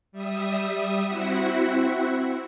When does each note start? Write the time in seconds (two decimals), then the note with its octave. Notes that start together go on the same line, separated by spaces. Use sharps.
0.12 G3 E5 D#6
1.06 C4 E4 F#4 E5 F#5